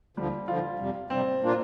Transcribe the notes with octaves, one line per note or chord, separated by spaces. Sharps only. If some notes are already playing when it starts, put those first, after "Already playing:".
D2 D3 F3 G3
D2 D3 F3 F4
F2 C3 G3
F2 C3 G3 C4
A#2 A#3 D4 F4